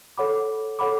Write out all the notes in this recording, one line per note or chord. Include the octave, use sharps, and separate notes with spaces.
A4 C#5 F#5 B5 D6
A4 C#5 F#5 B5 D6